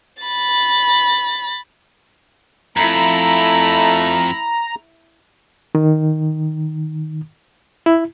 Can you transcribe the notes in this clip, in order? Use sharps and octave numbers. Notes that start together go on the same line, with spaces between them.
B5 A6
F2 A3 E4 A#5 B5
D#3
E4